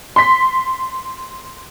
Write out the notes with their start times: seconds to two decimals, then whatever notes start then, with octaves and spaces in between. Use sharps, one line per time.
0.16 C6 B6